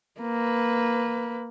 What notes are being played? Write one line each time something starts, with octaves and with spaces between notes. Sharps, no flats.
A#3 B4